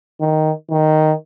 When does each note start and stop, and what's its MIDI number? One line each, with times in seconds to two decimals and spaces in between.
0.21 0.51 51
0.71 1.13 51